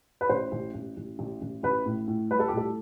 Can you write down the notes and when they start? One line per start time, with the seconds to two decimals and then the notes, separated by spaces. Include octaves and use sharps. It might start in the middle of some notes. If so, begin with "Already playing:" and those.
0.21 B4
0.29 A1 C5
0.52 A1
0.74 A1
0.97 A1
1.19 A1
1.42 A1
1.63 A1 B4
1.86 A2
2.08 A2
2.31 G3 B4
2.39 A4
2.48 G4
2.53 A2 A4